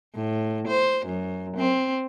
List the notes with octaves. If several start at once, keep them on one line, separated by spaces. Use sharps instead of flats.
A2
C5
F#2
C4